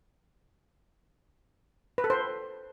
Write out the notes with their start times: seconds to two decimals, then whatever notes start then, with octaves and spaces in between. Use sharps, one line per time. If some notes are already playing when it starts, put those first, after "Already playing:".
1.98 B4
2.04 A4
2.10 C5